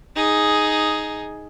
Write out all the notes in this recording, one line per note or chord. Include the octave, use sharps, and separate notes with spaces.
D#4 G#4